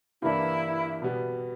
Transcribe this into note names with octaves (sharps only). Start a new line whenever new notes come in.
G2 E3 A#3 D4 E4
B2 G3 B3